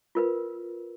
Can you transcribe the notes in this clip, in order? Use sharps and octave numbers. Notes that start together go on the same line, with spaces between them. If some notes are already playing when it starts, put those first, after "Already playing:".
F4 A#4 B4